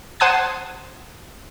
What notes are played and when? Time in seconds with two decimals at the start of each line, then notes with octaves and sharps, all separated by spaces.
0.20 C5 F#5 A5 D#6 F#6 G#6